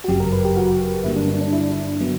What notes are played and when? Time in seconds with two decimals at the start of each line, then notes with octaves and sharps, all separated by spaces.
0.04 F#4
0.08 G1 F#2 C#3 F#3 G4
0.20 A#4
0.32 B4
0.44 G4
0.56 F#4
1.04 G2 D3 G3 A#3 E4
1.16 D4
1.28 D4
1.41 D4
1.53 E4
1.61 D4
1.70 E4
2.00 D3 F#3 B3